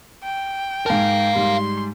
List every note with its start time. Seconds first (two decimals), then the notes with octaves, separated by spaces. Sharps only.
0.23 G5
0.86 G#2 A#4 F5 A5
1.35 G#2 G3 C6